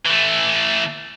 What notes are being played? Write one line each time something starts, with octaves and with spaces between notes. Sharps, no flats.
E3 A3